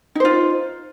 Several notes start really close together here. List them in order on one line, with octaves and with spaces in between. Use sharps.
D#4 C5 F4